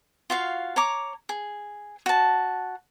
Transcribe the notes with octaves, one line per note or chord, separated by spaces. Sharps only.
F4 F#4 F5
C#5 A#5 D6
G#4
F#4 A5